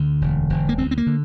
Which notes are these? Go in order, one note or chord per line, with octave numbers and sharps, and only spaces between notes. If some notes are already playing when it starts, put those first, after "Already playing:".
Already playing: D2 D3
E1
E1
A#3
D2 C4
C4
A#3
D3